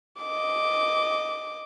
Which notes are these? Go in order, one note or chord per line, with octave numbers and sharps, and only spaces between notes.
D#5 D6